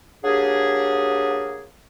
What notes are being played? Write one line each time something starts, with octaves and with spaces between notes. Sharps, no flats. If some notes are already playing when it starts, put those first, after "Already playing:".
F#3 A#3 D4 G4 G#4